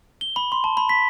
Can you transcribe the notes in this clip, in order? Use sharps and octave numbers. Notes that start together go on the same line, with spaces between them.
G7
B5
C6
A5
B5
B6